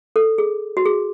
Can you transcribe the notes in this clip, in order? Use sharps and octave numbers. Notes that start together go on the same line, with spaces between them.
A4
G#4
F#4
G#4